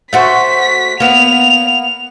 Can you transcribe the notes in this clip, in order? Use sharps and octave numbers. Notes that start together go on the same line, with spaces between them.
A3 F#4 C5 B6
A#3 B3 F7